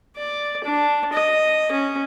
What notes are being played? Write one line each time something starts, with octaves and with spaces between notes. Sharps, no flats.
D5
D4
D#5
C#4